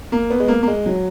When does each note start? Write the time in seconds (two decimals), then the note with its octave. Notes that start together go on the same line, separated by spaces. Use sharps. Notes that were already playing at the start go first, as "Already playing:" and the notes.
0.12 A#3
0.30 B3
0.40 G#3
0.48 A#3
0.63 A#3
0.68 G#3
0.86 F#3